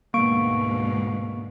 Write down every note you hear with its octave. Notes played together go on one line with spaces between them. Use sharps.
D2 G#2 B2 A#3 C#6 D7